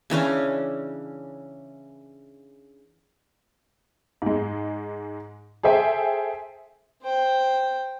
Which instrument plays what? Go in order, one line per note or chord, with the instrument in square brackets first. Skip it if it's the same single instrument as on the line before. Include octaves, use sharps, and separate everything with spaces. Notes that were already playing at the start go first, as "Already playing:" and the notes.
[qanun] C#3 E3 C#4 D4
[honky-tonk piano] G#2 G#3
G#4 A4 C5 E5 G5 G#5
[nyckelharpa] C5 G5